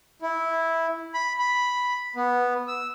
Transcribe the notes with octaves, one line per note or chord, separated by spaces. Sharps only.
E4
B5
B5
B3
E6